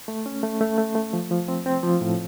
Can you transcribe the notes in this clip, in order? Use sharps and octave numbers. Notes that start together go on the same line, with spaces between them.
A3
C#4
A3
A3
A3
A3
F3
F3
C4
C4
F3
A2